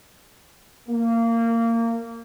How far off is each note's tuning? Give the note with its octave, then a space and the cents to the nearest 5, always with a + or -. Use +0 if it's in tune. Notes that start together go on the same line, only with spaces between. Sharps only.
A#3 -20